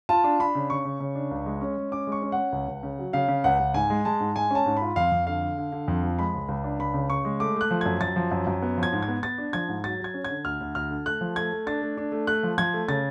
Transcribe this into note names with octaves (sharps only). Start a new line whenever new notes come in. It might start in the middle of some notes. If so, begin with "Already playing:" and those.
F4 A5
D4
D4 B5
C#3
C#3 C#6
C#3
C#3
D4
C#2
G#3
C#4
G#3
C#4 D6
G#3 C#6
C#4
C#4 F#5
C#2
C#2
C#3
F#3
C#3 F5
C#3
C#2 F#5
C#2
G#2 G#5
G#3
G#3 A5
G#2
G#3 G#5
C#4 A5
G#2
B5
F4
F2 F5
F2
D3 F5
D3
D3
D3
F2
F3
G#3 B5
C#2
C#2
D4
C#2 B5
C#3
C#3 C#6
G#3
A3 D6
A3 F#6
F3
F#2 G#6
F#2 A6
F3
F#2
F#2
B3
F3
G#6
G#2
G#6
B3
B3 A6
D4
F3 G#6
G#2
F#3 A6
F#3 G#6
C#4
D3 G#6
D2 F6
D2
D2 F6
D3
A3 F#6
F3
A3 G#6
A3
D4 A6
A3
D4
A3
A3 F#6
F3
F3 G#6
A3
C#3 A6